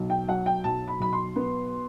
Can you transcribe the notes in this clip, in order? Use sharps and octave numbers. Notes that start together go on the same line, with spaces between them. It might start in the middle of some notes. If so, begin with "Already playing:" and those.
Already playing: B1
G5
F#3 F#5
G5
B1 A5
B5
B1 B5
C6
B3